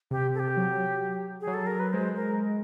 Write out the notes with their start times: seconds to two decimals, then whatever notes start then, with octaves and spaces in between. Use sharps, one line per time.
0.11 C3 G4
0.34 A4
0.39 G4
0.57 F#3
1.41 G#4
1.47 F#3
1.54 A4
1.66 A#4
1.80 B4
1.93 G#3 C5
2.16 A#4